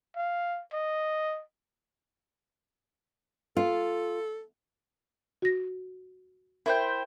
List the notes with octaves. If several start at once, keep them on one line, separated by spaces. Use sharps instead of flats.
F5
D#5
F4 A4
F#4 A#6
E4 A#4 C5 G5